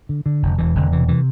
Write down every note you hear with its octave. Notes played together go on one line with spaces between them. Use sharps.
D3
D3
F1
E1 E3
E1 D3
C3 E3
C3 E3